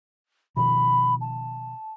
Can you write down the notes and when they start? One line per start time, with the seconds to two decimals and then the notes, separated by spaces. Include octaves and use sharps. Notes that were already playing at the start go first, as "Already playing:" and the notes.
0.57 B2 D#3 F3 B5
1.21 A5